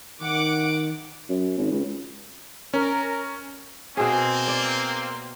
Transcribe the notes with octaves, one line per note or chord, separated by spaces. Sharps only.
D#3 F#5 D6 D7
F#2
G#1
C#2
C#4 A#4
B2 A#3 C4 G#4
D5